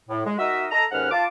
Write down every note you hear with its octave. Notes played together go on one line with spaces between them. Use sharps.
A2
G#3
D#4 F#4 A#4 D#5 E5
A4 D#5 A#5
D#2 G#2 C#4 B4 F#5 F6
F4 A5 D6